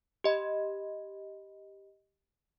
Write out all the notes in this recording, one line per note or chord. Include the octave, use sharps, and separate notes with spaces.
G4 D#5 B5